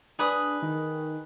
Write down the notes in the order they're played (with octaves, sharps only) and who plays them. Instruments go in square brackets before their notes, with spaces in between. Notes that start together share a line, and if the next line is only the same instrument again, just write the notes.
[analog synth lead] D4 [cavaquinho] G#4 B4 D#6
[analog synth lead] D#3